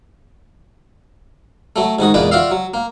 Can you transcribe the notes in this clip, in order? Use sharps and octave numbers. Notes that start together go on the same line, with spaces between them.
F#3 A3
G#2 D#3 F#4 D#6
E2 A#2 G#3 B4 D5
F4 F#4 D5 E5 F5
F#3
A#3